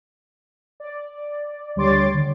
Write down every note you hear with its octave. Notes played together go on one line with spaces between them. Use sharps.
D5
D2 G3 C#5 C6 D6 A6
D3